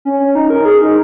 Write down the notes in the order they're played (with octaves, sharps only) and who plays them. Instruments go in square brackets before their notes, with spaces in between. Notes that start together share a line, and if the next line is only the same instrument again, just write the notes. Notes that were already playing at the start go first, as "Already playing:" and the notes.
[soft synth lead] C#4
C#4
D#4
A#4
G#4
D#4